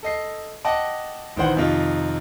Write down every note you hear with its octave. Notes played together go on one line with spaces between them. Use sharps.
A4 D#5 C7
D#5 F#5 G5 A5 D6
A#1 D#3 E3 C5 F#5
F2 C3 D#3 D#4 F4